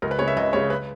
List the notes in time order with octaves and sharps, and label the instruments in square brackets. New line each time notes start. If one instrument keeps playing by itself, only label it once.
[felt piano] C#2 A#4
B4
C#3 C#5
G#3
E5
C#2 D#5
C#3 G#3 C#5
B4